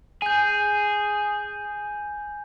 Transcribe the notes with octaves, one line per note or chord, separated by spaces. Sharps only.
G#4 G#5 G6